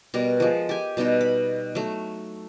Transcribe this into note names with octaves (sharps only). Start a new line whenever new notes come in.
B2 G3 A#4
F3 G#3
G4 G#5
B2 G3 D#4 G4
B5
F#3 A3